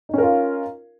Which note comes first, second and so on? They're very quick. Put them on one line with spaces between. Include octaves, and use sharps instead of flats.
D#4 C#4 A#4 F4